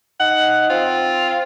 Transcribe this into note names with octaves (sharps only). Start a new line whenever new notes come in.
D#4 F#5
C4 F4